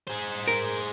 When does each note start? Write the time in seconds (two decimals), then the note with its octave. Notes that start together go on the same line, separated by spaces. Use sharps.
0.08 G#4 C5
0.47 A#4